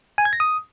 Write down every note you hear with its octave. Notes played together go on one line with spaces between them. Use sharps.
G#5
G#6
A#6
D#6